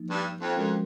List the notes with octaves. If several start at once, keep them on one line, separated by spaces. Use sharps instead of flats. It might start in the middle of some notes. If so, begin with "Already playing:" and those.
Already playing: F3 A#3 D#4
G2
F2
F2 F3 G#3 C#4 F#4 A#4